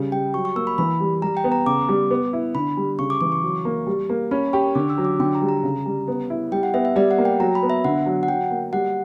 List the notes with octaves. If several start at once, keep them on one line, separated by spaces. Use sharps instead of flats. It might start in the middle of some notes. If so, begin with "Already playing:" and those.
Already playing: C#3 G3
G3 G5
F#3 C#6
C#6
A#3 E6
B5
E3 B5
G3
G3 A#5
G5
B3
A#5
C#3 D6
G3
B3
E4
D3 B5
G3
C#3 C#6
D6
E3 D6
C#6
F#3
A#3
G3
A#3
C#4 B5
G4 C#6
D3 D6
E6
F#3
D6
D3 G5
A#5
G3
A#5
C#3
G3
B3
E4
G3 G5
F#5
B3 E5
E5
G3 D5
F#5
A#3
G5
F#3 A#5
B5
B3
E5
D3 F#5
F#3
F#5
F#3 G5
A#3
G3 F#5